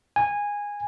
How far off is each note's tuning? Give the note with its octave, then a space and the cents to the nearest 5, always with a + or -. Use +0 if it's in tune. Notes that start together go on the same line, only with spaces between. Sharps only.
G#5 -15